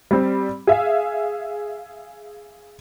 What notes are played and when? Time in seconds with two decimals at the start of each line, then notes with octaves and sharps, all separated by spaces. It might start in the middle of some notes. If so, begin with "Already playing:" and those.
0.11 G3 C4
0.67 G#4 E5 F5